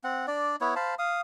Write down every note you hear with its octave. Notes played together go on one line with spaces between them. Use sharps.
C4 F#5
D4 D5
B3 E4 C#5
C5 F5 A5 B5
F5 D#6